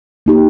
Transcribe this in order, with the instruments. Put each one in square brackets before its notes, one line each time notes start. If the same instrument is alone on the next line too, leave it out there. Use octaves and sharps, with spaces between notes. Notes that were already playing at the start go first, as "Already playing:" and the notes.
[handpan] A#3 D#4 G4